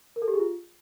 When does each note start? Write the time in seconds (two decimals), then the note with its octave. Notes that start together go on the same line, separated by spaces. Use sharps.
0.16 A#4
0.22 A4
0.28 G4
0.34 G#4
0.39 F4